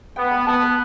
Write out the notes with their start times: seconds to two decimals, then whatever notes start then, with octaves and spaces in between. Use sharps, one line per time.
0.16 B3 G5
0.31 B5
0.46 B3 A5
0.62 B4